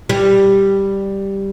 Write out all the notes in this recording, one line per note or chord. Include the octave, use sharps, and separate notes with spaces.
G3